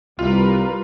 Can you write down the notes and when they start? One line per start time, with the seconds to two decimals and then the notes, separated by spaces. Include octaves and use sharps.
0.19 C2 G3 F4 A#4 B4